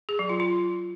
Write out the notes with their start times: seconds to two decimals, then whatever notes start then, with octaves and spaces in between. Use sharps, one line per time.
0.09 G#4
0.19 F#3
0.29 F4
0.40 F4